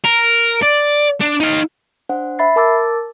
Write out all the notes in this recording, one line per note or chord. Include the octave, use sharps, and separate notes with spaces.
A#4
D5
D4
D#4 F5
D4 C5 F#5
E5 B5 A6 C7
A#4 A5 D6 E6 A6